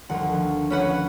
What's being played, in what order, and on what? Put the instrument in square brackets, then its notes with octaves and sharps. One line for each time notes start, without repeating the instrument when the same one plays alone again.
[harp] D2 D#3 F3 [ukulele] F#5
[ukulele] C#4 B4 F#5